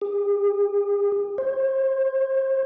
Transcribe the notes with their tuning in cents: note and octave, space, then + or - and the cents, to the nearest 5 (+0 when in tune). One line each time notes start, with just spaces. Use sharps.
G#4 -45
C5 +35